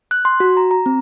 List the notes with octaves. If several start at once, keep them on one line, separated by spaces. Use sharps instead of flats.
F#6
C6
F#4
A#5
A#5
C4